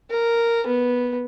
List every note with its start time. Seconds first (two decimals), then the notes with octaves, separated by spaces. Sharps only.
0.10 A#4
0.67 B3